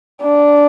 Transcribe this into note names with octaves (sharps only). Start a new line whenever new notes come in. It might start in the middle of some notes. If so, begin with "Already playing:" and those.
D4